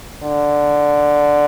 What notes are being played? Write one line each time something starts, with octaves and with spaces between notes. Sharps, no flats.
D3